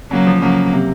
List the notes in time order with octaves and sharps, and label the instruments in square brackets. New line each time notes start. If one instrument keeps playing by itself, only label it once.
[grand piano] C#3 [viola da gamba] F#3 A#3
[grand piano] F3
[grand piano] C#3 [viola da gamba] F#3 A#3
[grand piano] C3